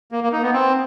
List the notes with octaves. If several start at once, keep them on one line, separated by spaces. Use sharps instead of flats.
A#3
A#3
D#4
B3
C4